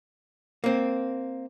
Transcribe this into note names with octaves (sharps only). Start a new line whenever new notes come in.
A#3 C4